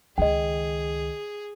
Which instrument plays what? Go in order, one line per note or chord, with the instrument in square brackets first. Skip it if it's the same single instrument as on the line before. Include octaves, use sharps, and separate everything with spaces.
[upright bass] C#2 D#3 [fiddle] G#4 [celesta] D#5 G5